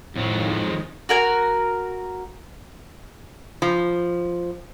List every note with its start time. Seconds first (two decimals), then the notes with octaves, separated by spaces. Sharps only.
0.16 F2 A2 D#3 F3 F#3 G#3
1.09 F#4 A#4 G#5
3.62 F3